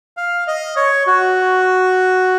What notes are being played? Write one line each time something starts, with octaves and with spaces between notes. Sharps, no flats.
F5
D#5
C#5
F#4